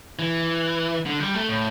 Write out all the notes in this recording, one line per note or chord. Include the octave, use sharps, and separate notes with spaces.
E3
D3
G3
A3
A2